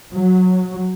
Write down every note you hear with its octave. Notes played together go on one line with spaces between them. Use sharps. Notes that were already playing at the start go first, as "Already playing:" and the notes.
F#3